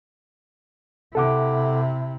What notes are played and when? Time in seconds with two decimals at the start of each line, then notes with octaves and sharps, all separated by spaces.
1.15 C3 E4 A4 F#5 D6